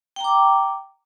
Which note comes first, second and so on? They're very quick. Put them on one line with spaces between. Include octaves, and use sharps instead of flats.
G5 A#5 D6